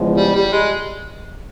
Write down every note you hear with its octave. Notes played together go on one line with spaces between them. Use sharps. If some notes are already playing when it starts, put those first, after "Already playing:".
Already playing: E2 C#3 F3 G#3
G3
G3
G#3